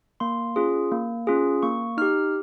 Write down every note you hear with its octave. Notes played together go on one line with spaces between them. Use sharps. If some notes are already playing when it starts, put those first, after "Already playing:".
A#3 C6
C#4 F4 G#4
A#3
C#4 F4 G#4
A#3 C#6
D#4 G4 F6